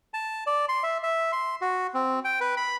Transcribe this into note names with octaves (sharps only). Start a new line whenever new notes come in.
A5
D5
C6
E5
E5
C6
F#4
C4
G5
B4
B5